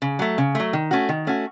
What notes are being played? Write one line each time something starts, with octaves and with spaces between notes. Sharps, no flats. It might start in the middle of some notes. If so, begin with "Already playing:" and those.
C#3
F#3 A3
C#3
F#3 A3
D#3
A3 C#4 F#4
D#3
A3 C#4 F#4